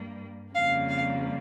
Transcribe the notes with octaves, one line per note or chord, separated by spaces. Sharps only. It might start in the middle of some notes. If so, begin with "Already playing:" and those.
Already playing: G2 G3 A#3
F2 C#3 G3 A#3 F5
F5